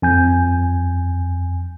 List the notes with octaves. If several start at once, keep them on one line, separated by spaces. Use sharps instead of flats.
F2 G#5 G6